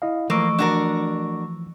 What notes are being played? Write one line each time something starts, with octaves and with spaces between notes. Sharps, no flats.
E4 D#5 F5
E3 F3 A3 A#3 C#6 E6 D7
D4 F#4 A#4